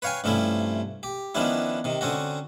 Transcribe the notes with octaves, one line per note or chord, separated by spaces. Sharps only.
B4 C#5 F5 G5 G#5
G2 C3 F3 A3 C#4 E4
G4
D#3 F3 B3 C#4 D4 E4
C3 D#3
D3 C4 C#4 F#4